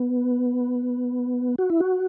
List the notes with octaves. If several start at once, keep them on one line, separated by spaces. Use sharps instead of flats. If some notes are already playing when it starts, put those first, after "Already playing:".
Already playing: B3
F#4
E4
F#4